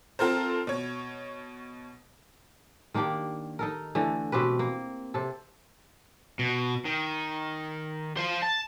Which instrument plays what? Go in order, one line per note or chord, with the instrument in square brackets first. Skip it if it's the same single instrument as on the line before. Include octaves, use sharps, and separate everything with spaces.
[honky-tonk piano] C4 F4 A4 A#4 C5
B2 C#5
[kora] D#3 A#3 D4 G4
D#4 A4 A#4
D3 E3 A3
B2 C4 G4 B4
A#3
C3 A4
[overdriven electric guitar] B2
D#3
C5 F5
A5